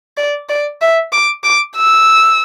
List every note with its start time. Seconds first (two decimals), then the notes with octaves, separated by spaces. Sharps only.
0.17 D5
0.49 D5
0.82 E5
1.12 D6
1.44 D6
1.76 E6